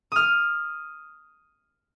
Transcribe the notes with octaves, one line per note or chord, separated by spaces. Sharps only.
D#6 F6